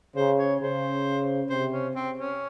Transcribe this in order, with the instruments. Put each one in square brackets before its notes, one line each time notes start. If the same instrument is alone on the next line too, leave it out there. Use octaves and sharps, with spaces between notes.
[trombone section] C#3 [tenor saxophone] C5
[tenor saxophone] C#5
[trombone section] C#3 [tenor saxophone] C5
[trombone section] C3 [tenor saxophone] C5
[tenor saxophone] C#4
C4
C#4